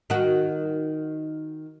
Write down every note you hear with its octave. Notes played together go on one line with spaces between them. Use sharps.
D#3 F#4